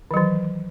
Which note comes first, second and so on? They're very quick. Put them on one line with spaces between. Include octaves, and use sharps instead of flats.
D#3 F#3 E3